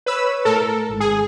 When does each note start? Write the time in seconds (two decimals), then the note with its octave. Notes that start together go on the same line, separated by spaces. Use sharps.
0.06 B4 C#5 B5 E6
0.45 A2 A3 A4 A#4
0.89 G#1
1.00 G#4